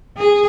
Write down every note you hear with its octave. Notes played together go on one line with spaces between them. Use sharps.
G#4